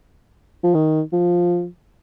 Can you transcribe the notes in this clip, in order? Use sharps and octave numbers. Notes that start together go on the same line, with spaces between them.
F3
D#3
F3